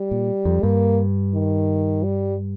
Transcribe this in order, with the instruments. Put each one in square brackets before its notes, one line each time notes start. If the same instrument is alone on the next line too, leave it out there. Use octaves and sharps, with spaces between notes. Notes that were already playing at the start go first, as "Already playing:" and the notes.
Already playing: [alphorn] G3
[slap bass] A#2
F2
[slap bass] G2 [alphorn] A#3
[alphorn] D#3
G3